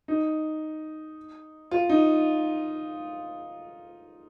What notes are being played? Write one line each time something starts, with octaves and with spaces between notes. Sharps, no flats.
D#4
F4
D#4